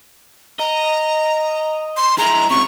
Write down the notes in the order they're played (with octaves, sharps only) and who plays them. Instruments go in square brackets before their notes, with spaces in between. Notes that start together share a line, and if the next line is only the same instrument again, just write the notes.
[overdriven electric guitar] D#5 [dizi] A#5
[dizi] C6
[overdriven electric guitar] G#3 E4 [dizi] A#5
[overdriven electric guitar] C#2 C3 [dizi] C#6